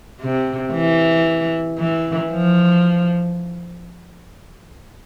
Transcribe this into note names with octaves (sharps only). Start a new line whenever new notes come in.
C3
E3
E3
F3